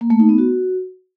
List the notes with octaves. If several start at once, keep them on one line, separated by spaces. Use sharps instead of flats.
A#3
A3
D#4
B3
F#4